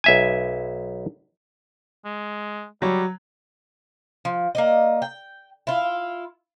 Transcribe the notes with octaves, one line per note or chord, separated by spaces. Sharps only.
B1 E5 G#5
G#3
F#3 G3 C#5
F3
A#3 D5 D#5
G5
E4 F4